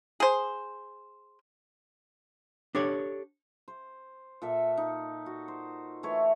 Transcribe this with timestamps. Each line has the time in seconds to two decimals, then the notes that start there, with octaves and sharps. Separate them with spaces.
0.20 G#4 C5
2.75 D4 G4 A4 C#5
3.68 C5
4.42 A#2 A4 E5
4.77 D#4
5.26 F#4
5.48 C5
6.03 E3 A3 E4 C#5